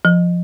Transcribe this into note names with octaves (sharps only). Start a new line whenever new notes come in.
F3